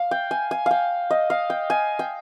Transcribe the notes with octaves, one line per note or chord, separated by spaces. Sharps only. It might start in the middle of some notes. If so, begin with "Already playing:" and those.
Already playing: F5
G5
G#5
G#5
F5 G5
D#5
F5
G5
G#5
G5